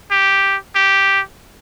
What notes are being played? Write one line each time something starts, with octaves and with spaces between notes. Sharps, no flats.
G4
G4